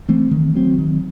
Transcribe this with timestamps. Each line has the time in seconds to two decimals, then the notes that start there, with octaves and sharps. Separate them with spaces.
0.09 E3 A3 C4
0.31 D#3
0.55 F#3 C4
0.78 D#3